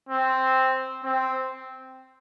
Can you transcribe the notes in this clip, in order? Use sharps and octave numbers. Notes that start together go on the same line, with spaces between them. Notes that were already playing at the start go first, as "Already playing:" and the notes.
C4
C4